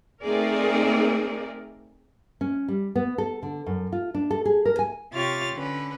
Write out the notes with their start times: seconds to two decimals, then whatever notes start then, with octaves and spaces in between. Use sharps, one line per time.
0.22 A3 C4 D#4 G#4 A#4 D5
2.41 C#4
2.68 G3
2.96 B3
3.18 A4
3.43 D3
3.66 F#2
3.92 F4
4.14 D4
4.31 A4
4.45 G#4
4.65 A#4
4.79 G#5
5.14 C3 F4 G4 C#5 F6 A6
5.56 D3 C#4 B4